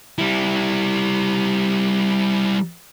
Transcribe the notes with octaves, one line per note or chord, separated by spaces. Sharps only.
G3 E4